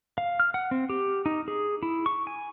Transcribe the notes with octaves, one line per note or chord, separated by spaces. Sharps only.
F5
F6
F#5
C4
G4
D#4
G#4
E4
C#6
G#5